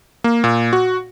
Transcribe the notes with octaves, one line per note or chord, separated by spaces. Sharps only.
A#3
A#2
F#4